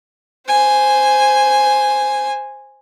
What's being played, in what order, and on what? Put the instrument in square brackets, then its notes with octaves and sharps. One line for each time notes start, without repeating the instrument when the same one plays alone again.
[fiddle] C5 G#5